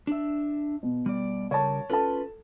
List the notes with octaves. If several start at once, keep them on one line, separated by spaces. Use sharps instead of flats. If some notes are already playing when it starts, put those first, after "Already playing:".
D4 E5
B2
G3 D5
C#3 G3 A#4 C#5 A5
C#4 F4 A4 B4 A5